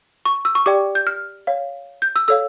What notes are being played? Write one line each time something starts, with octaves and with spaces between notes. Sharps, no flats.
C#6
E6
C#6
G4 D5 G5 D6
G6
F6
C#5 F5
G6
E6
A4 C#5 F5 E6